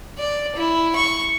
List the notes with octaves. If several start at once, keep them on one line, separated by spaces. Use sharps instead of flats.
D5
E4
C#6